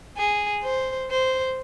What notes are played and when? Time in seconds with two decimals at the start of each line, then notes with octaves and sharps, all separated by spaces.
0.18 G#4
0.64 C5
1.10 C5